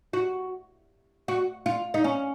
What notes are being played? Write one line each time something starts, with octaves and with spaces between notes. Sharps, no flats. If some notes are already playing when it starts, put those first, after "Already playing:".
F#4
F#4
F4
D#4
C#4